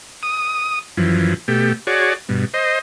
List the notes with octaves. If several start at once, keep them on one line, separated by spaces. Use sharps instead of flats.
D#6
F#2 E3 F3
B2 A3 G4
F#4 G#4 C#5 D5
G2 B2
C5 D#5